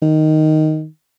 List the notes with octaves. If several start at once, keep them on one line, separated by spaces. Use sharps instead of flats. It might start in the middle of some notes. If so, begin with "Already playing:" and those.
D#3